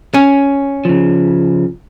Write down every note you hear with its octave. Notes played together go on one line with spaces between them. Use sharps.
C#4
C#3 F3